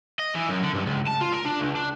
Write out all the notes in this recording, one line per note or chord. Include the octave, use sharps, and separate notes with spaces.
D#5
E3
F#2
D3
G2
C#2
A5
F4
A#4
D4
C#2
D4